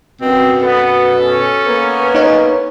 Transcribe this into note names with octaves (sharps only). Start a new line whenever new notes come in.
F#2 B2 C4
B3 A4
C#4
A#3 B3
D#4 C#5